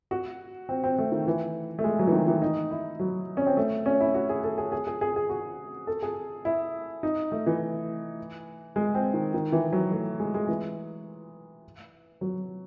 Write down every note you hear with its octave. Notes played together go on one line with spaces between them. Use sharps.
F#4
C4
C4
A3
D#3
E3
A3
G#3
F#3
E3
D#3
E3
D#4
E4
F#3
C#4
C4
A3
C#4
E4
F#4
G#4
A4
G#4
G#4
G#4
G#4
G#4
F#4
A4
G#4
E4
D#4
A3
E3
G#3
C4
D#3
D#3
E3
F#3
A3
G#3
G#3
E3
F#3